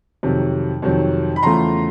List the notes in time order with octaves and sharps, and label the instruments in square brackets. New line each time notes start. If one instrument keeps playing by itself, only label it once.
[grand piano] F2 C3 D#3 F#3
F2 C3 D#3 F#3
B5
E2 C#3 F3 A3 A#5 C6